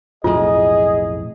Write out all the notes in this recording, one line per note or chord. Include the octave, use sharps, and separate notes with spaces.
B1 F2 A2 F4 G#4 D#5